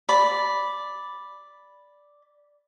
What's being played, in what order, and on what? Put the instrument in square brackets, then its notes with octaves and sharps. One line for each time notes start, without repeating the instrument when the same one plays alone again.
[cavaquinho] D5 B5